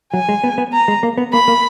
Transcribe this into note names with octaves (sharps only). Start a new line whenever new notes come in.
F#3 G#5
G#3
B3
B3
A#5
G#3
A#3
B3
A#3 B5
A#3